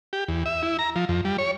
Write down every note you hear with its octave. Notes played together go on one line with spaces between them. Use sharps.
G4
E2
E5
E4
A#5
F3
F2
G3
C#5